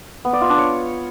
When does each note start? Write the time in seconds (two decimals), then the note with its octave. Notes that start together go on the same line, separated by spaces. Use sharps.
0.25 B3
0.33 D5
0.41 F4
0.50 D4
0.58 C#5